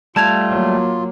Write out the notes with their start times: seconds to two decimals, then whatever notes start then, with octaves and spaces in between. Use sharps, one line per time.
0.16 G3 A3 F4 A5 G#6 F7
0.50 F#3 A#3